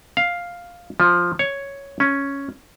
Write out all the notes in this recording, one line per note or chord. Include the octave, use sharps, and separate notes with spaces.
F5
F3
C#5
C#4